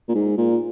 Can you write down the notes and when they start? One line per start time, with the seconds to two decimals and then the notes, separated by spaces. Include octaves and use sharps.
0.09 A#2
0.15 G#2
0.37 A#2